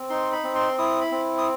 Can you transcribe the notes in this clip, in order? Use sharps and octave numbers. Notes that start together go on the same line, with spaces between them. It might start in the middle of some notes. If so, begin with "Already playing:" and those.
Already playing: C4
D#4 C6
B5
C4
C6
E4 D#6
B5
C4
D#6